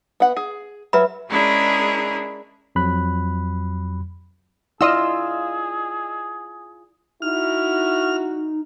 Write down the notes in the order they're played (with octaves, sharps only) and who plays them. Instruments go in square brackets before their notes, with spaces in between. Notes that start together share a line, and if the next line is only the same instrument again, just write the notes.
[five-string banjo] B3 F#5
G#4
[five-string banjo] F#3 [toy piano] B4 E5 B5
[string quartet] G#3 C#4 D4 E4 G#4 A#4
[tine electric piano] F2 F#3 B5 F#6
[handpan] E4 D5 [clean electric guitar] F4 [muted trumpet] G#4 [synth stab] D#5 E6
[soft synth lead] D#4 [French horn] E4 [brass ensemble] F#4 [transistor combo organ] F6